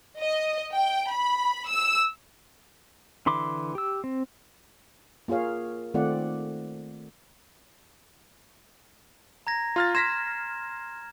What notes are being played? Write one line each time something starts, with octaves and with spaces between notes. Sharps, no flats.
D#5
G5
B5
E6
D3 E3 B5 C6 D6
G4 E6
C4
A#3 F4 G#4 C#5 F5
D#3 A3 C4 F4 D5 F#5
A#5 G#6 A#6
F4 F6 A6
C6 F6 G#6 A#6 B6 E7